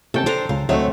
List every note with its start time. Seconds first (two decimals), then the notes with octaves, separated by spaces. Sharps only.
0.14 D#2 C3 A3 C#4 A4 G5 A5
0.26 D4 A4 C5 G5 A#5
0.49 C#2 C#3 F4
0.69 D2 F#3 A3 C4 C#5 D#5 E5